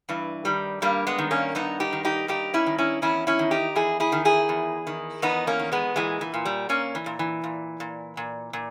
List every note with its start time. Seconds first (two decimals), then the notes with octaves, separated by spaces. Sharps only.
0.09 G2 E3
0.45 D#3 G3
0.82 G2 G3 A#3
1.07 G#3 B3
1.18 D#3
1.31 A#3 C#4
1.55 G2 B3 D#4
1.80 D#4 G4
1.93 D#3
2.05 D#4 G4
2.28 G2 D#4 G4
2.54 C#4 E4
2.66 D#3
2.78 C#4 E4
3.02 E2 C#4 E4
3.27 C#4 E4
3.39 D#3
3.51 D#4 G4
3.76 E2 E4 G#4
4.00 E4 G#4
4.12 D#3
4.25 E4 G#4
4.49 E2
4.87 D#3
5.22 E2 B3 D#4
5.47 A#3 C#4
5.59 D#3
5.72 G#3 B3
5.96 A#2 E3 G#3
6.21 E3
6.34 A#2
6.45 G3
6.69 A#2 A#3 C#4
6.95 E3
7.06 A#2
7.19 E3
7.44 A#2
7.80 A#2
8.17 A#2
8.53 A#2